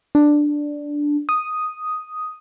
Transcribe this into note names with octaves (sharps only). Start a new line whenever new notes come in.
D4
D#6